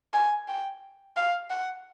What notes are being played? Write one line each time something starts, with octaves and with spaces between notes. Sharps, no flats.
G#5
G5
F5
F#5